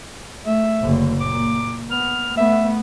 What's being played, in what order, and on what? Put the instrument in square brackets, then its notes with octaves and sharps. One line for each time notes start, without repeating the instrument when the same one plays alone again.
[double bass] A3 [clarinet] E5
[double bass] F#1 D3
[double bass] A#2 [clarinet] D6
[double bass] B3 [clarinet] F6
[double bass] A3 B3 [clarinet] E5